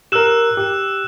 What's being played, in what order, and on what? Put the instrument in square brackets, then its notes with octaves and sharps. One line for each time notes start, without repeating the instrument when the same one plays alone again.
[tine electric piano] G4 A#4 [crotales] E6 F#6 E7
[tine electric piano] G4